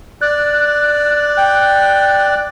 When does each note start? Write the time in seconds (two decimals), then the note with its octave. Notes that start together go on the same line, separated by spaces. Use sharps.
0.21 D5 F#6
1.37 G5